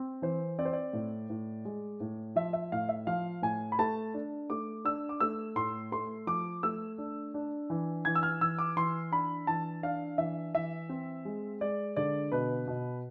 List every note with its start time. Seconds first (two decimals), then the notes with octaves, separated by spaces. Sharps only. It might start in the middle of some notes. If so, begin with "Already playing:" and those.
Already playing: C4
0.22 E3 C5
0.59 C4 D5
0.65 C5
0.73 D5
0.93 A2
1.30 A2
1.65 G#3
2.00 A2
2.36 F3 E5
2.53 E5
2.72 A2 F5
2.89 E5
3.07 F3 F5
3.42 A2 G#5
3.72 B5
3.79 A3 A5
4.14 D4
4.50 A3 D6
4.85 D4 E6
5.09 D6
5.20 A3 E6
5.56 A2 C6
5.92 A3 C6
6.27 F3 D6
6.63 A3 E6
6.98 D4
7.34 D4
7.70 E3
8.05 E3 G#6
8.15 E6
8.23 F6
8.41 E3 E6
8.58 D6
8.77 E3 C6
9.12 D4 B5
9.47 E3 A5
9.83 D4 F5
10.18 E3 E5
10.55 E3 E5
10.89 C4
11.25 G#3
11.61 G#3 D5
11.96 D3 D5
12.32 B2 B4
12.67 B2